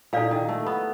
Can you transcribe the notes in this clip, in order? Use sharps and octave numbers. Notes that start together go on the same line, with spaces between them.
A#2 E4 A4 D5 F5
D#3
A3
B3